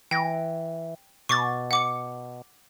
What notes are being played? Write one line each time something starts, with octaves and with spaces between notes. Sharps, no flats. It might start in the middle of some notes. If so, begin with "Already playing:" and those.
E3 G5 A#6
B2 C#6 D6 A6
F#5 D6 C#7